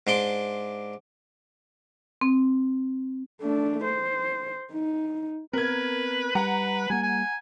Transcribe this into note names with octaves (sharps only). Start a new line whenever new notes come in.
G#2 D4 C6 D6
C4
A3 D4
C5
D#4
B3 C4 A#4 B4 G#6
G3 B4 F#5 A#5
G3 A#3 G#5
G#5